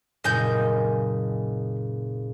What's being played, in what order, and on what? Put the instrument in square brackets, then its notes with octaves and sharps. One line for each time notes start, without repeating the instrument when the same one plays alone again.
[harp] F#1 A#2 [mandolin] D#5 G#5 G6